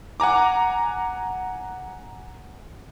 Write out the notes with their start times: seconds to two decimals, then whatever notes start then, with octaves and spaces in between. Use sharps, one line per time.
0.20 F#5 G#5 A#5 D6